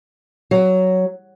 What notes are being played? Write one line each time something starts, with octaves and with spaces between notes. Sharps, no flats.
F#3